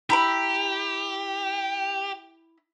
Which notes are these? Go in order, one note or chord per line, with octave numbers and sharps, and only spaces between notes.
E4 G4 A#5 B5